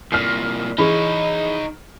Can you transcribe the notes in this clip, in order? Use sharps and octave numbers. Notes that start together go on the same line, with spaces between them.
C2 A#2 F6 C7
E3 D#4 G#4 C#5 B5